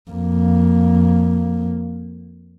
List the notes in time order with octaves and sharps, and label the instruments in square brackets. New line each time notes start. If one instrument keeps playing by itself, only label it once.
[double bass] F2 A#3